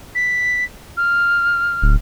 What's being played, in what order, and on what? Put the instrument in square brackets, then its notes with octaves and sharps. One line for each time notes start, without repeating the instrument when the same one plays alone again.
[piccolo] B6
F6
[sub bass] D1